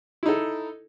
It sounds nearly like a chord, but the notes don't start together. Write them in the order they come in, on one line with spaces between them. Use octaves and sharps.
E4 D#4 A4